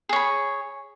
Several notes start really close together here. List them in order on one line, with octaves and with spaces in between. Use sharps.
G#4 C#5 B5